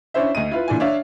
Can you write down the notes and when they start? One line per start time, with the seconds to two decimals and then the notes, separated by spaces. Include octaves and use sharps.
0.14 C#4 D4 E4 C5 E5
0.35 D2 D#5 D#7
0.51 E4 F4 B4
0.68 A#2 E3 D4 G#5
0.80 D4 C#5 E5 F5